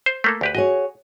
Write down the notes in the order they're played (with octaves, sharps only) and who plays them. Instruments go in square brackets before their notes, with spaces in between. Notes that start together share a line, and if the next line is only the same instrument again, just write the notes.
[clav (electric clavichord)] C5
A3 A#3 A4
D2 G4 B4
[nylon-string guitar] F#4 G#4 C#5 [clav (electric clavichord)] D#5